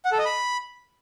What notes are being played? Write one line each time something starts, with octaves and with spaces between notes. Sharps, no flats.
F#5
A4
D#5
B5